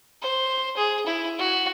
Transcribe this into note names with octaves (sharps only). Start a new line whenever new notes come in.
C5
G#4
E4
F#4